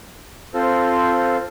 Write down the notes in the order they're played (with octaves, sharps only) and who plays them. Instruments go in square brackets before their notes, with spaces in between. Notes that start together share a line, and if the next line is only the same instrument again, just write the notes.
[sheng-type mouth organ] C4 F4 A4 C5